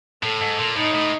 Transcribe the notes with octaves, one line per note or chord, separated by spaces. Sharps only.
A2 A4
G#2
A#2
A2 D#4
A2